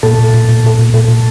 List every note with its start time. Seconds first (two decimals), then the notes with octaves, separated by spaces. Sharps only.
0.03 A#2 A4
0.19 A#2
0.34 A#2
0.49 A#2
0.64 A#2
0.79 A#2
0.94 A#2 A4
1.08 A#2